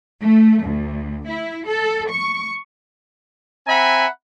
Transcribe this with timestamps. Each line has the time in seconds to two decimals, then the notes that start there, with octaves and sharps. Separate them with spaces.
0.21 A3
0.63 D2
1.27 E4
1.67 A4
2.10 C#6
3.67 C4 E5 F#5 G#5 A#5 B5